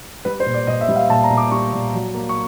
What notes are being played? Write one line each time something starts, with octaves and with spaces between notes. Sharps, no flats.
G3 B4
C5
A#2
D5
A#2 D#5
E5
G3
F5
A#2 A5
A#5
A#2
D6
G3 C#6
A#2
F#3
A#3
C#6